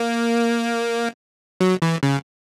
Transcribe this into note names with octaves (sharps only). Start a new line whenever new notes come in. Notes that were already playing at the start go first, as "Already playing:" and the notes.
Already playing: A#3
F#3
E3
C#3